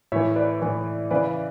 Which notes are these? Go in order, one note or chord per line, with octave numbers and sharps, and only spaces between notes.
A2 E3 C#5 E5
B4 D5
A2 E3
C#3 E3 B4 D5